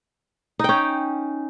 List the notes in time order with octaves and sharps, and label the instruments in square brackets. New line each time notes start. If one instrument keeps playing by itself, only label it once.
[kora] D#4
G5
C#4